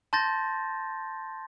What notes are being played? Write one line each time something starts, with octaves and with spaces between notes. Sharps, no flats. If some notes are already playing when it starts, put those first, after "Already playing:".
A5 C6 G6 A6 A#6